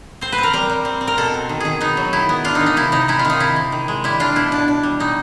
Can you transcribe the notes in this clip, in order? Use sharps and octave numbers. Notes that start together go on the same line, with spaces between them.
C4 C5
B4
C4
A#4
G3 A#4
G3
C4
C4
A#4
B2 A4
C4
D#3
D#3 G#4
B3 D#4
F#3
D#3 E4
B3
D4 F4
D#4
D#3
D#4
C3 E4
C3 D#4
G#3 E4
F4
D#3 D#4
C3 E4
C3
D#3
G#3
G3 E4
D4 F4
B2 E4
D4
D4
G3
B2 D#4